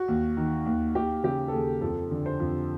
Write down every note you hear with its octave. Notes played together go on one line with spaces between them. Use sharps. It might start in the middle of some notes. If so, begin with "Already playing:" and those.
Already playing: F#4
D#2
D#3
D#2
D#2 G4
C#3 G4
A4
D#2 G#4
F2 A4
D3
C5
F2